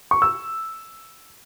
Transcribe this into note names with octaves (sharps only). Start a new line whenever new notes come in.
C#6
E6